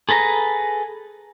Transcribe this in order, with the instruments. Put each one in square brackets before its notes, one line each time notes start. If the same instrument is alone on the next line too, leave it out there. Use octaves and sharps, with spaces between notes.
[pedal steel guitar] G#4 A4 B4 A#5